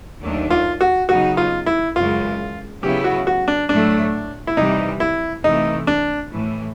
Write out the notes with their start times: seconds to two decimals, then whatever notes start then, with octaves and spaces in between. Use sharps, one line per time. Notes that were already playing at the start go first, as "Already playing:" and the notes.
0.22 D#2 D#3 F#3 A3 D4
0.50 F4
0.81 F#4
1.09 C#3 F#3 B3 D#4 F#4
1.37 F4
1.66 E4
1.96 F#2 C#3 E3 G#3 F4
2.83 C#3 F#3 B3 E4 G4
3.04 F#4
3.27 F#4
3.48 D4
3.69 A2 F#3 A3 D4
4.47 E4
4.57 C3 E3 G3 D#4
5.00 E4
5.44 C3 E3 A3 D#4
5.87 D4
6.31 A2 E3 A3